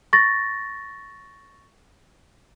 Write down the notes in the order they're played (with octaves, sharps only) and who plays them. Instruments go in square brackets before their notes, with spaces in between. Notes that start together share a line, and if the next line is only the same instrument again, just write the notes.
[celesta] C#6 A6 A#6